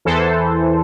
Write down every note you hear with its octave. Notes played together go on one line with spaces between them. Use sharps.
E2 E3 A4 C5